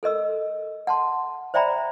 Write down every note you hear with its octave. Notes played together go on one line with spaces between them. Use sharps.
A4 A#4 D#5 E6
F#5 A5 C6
C5 D5 E5 G5 A#5 B5